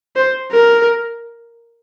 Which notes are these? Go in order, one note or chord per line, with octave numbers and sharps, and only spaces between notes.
C5
A#4